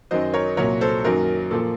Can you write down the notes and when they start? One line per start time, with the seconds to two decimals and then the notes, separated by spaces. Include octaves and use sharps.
0.11 F#2 D#3 F#3 C5 D#5
0.34 A#4 C#5
0.57 C2 A#2 F#3 A#4 C#5
0.81 A4 C5
1.04 F#2 D#3 F#3 A#3 A#4
1.51 A#2 F3 A#3 A4